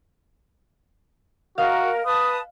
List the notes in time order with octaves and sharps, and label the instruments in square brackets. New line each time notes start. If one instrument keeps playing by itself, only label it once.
[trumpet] F#4 [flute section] A#4 [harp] D#5 F5
[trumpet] B4 [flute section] A5 D#6